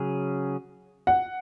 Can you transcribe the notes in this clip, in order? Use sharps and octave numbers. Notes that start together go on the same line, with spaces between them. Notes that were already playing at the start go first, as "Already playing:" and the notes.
Already playing: C#3 F#3 C#4 G#4
F#5